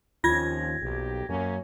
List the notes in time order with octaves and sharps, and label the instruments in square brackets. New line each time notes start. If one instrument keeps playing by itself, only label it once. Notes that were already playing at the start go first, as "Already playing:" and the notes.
[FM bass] D#2 [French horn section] F3 C4 C#4 [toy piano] F4 [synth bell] G#6 A#6
[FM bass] B1 [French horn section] F2 A#3 G4
[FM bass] F#2 [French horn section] A#3 C#4